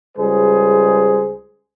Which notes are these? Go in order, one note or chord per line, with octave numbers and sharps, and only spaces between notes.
C#2 G3 G#4 C5